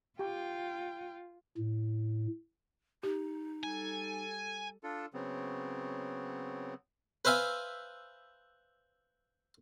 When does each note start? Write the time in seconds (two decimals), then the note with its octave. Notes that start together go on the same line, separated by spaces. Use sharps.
0.19 F4 G4 G5
1.57 A2
3.03 D#4 G4
3.64 G3 A4 G#5
4.83 D4 F4 A4
5.14 C#3 F#3 B3 C4
7.25 B4 C5 E5 F5 G#5